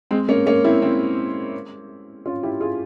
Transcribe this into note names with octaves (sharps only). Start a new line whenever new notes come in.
G#3 C4
A#3 C#4
A#3 C#4
C4 E4
C4 E4
C#4 F4
E4 G4
F4 G#4